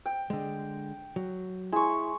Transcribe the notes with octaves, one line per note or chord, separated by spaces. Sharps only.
G5
D3 G#3
F#3
G#3 E4 C#6